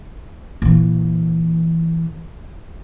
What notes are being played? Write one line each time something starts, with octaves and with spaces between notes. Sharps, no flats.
A#2 E3